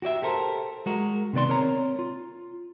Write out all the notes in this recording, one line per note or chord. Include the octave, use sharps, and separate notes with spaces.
F#4 G4 D5 E5
G4 A4 A#4 C5
G#3 F#4 A#4
C3 D#3 B3 D5 C6
C4 A#4 C#5 A#5
F4